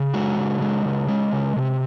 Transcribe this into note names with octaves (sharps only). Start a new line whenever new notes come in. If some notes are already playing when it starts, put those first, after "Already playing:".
Already playing: C#3
G#3 F#4
C#3
G#3
C#3
G#3
C#3
C3